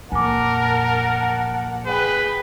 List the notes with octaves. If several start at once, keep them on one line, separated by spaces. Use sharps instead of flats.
F2 A#2 A#4 F#5 G#5 A5 D6
G#4 B4 G5